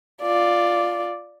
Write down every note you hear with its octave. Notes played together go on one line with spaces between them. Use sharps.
F4 D5